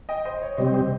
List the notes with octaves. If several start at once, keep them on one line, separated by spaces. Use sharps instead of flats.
D#5 G5
C5 D#5
C#5
C3 G3 C4 C5 D#5
C5 D#5